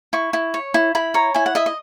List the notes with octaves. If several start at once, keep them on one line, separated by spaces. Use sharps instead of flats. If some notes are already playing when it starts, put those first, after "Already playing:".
E4 C#6
E4
C#5
E4
E4 B5
C#5 A#5
E4 G#5
F#5
D#5 E5
D#5